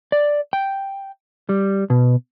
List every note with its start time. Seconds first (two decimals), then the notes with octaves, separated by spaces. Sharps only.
0.12 D5
0.53 G5
1.49 G3
1.90 B2